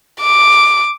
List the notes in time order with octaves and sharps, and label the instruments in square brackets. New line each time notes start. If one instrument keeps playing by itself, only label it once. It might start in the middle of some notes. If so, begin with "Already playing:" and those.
[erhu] D6